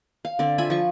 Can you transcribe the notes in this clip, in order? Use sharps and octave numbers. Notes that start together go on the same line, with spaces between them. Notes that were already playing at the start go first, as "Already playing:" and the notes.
F5
D3 C4 D5
F4 E5 G#5 B5
F3 C#6